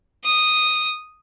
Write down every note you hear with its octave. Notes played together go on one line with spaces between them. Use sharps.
D#6